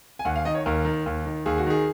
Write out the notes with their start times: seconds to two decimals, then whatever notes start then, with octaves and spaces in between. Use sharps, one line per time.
0.19 G#5
0.25 D#2 F#5
0.35 F5
0.45 D#3 D#5
0.54 C#5
0.66 D#2 A#4
0.85 D#3
1.06 D#2
1.26 D#3
1.46 D#2 G#4
1.58 F#4
1.66 D#3 G#4